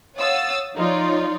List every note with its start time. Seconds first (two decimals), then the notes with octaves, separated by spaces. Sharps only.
0.16 C#5 F5 F#5 D#6 E6 A6
0.75 F3 D#4 F4 C#5 D5